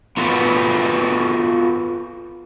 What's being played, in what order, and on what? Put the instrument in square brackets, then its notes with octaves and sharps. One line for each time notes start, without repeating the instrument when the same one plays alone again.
[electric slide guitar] B3 F4 F#4 A4 B4